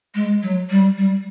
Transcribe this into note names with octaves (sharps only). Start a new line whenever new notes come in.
G#3
F#3
G3
G3